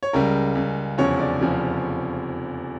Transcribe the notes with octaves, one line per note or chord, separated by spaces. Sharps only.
C#5
C#2 C#3 G3 A#4
C#2 C#3 G3
F1 E2 C#3 F3 C#5
D5
F1 E2 C#3 F3